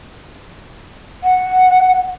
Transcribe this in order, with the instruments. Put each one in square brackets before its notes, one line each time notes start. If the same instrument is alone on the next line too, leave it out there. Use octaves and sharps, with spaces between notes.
[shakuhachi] F#5